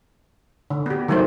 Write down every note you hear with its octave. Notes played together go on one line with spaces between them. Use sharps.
D3
B3 G4
D#3 F#3 G3 A3 A4 C5